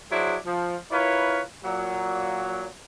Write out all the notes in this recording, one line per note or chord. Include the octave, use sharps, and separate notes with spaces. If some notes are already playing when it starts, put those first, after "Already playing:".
F#3 D4 E4 G#4 C5
F3
E4 F4 A#4 B4 C#5
A#2 F#3